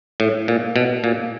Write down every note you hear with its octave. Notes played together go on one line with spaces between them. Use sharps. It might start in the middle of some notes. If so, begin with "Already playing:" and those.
A2
A#2
B2
A#2